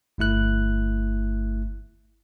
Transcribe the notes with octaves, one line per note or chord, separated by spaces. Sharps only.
G1 A3 E4 F#6